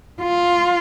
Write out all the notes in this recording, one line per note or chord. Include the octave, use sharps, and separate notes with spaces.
F4